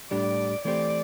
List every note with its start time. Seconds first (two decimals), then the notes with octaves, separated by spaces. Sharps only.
0.11 A2 G3 D4 G4 D5
0.65 E3 A3 C4 G4 D5